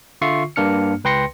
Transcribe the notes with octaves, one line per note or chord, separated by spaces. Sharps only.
D3 F4 E5 C#6 C7
G2 A#3 D4 F6 C#7
C#2 B4 G5 C6 A#6 C#7